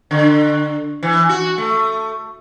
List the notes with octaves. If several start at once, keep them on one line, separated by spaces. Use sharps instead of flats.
D3
E3
F#4
A3